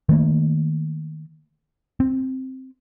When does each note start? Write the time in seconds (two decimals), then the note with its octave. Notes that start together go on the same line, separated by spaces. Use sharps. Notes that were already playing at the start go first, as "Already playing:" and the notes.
0.09 D#3 A3 A#3
2.00 C4